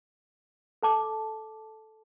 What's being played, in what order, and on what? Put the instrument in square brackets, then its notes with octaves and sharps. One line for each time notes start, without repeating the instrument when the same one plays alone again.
[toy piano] A4 A5 D6